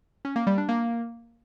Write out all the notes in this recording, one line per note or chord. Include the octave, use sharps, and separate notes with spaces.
C#4
A#3
G3
D4
A#3